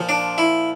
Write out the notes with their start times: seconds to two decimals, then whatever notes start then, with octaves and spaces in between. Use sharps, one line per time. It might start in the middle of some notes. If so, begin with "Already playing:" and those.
Already playing: A#2 F3
0.09 D4
0.38 E4